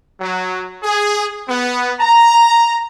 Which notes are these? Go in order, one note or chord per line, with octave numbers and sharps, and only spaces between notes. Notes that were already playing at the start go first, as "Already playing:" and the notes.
F#3
G#4
B3
A#5